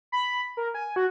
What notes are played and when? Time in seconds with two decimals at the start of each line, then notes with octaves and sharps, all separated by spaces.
0.12 B5
0.57 A#4
0.74 G#5
0.96 F#4